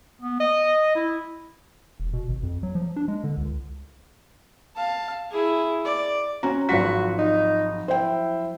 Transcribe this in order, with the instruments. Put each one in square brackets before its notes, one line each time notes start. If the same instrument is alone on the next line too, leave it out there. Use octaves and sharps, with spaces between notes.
[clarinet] B3
D#5
E4
[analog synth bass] E1
B2
G#1
F2
F#3
F3
D4
G#3
D3
C#2
[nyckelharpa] F5 A5
E4 G#4
D5
[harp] C4 F#4 [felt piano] C#4 A#5
[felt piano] G#1 B6 [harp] F3 F#3 F4 [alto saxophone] F#4
[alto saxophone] D#4
[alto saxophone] E4 [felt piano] C5 G5